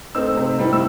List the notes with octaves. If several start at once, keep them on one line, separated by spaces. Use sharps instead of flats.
A3 C4 D#4 E6
C3
D#3 G3 C4 E4
E6